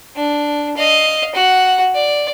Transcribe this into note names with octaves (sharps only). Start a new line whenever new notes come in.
D4
D#5 F5
F#4 F#5
D5